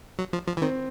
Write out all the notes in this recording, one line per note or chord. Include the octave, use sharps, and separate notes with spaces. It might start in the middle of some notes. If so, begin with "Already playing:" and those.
F#3
F3
F3
E3
D#3 C4